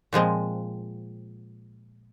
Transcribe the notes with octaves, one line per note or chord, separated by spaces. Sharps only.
A#2 F3 G#3 C4